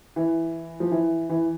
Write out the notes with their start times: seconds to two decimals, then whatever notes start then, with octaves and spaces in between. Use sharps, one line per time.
0.16 E3
0.80 F3
0.91 E3
1.29 E3